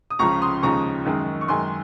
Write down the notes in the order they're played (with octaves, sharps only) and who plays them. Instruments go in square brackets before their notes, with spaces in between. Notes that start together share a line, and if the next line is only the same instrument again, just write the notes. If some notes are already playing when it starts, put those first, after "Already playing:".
[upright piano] D#6
C#2 C#3 F3 A#5 C#6
C6 D#6
D#2 C#3 F3 G#3 A#5 C#6
F#2 D#3 G#3
C#6
F#2 D#3 G#3 G#5 C6